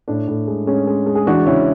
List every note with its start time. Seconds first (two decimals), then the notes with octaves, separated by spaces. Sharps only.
0.08 A2 D4
0.28 A2
0.48 G#3
0.67 G#3 C#4
0.87 G#3
1.06 G#3
1.15 G#4
1.27 E3 D4 F#4
1.46 C#3 C#4 E4